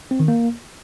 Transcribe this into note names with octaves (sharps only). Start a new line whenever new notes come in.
C4
D#3
A#3